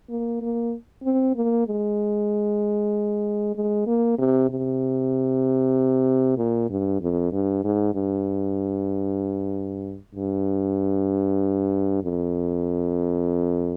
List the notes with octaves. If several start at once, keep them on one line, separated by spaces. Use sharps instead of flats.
A#3
A#3
C4
A#3
G#3
G#3
A#3
C3
C3
A#2
G2
F2
G2
G#2
G2
G2
F2